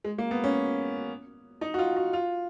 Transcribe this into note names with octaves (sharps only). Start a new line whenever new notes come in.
G#3
A#3
B3
C#4
D#4
F#4
F4
F#4
F4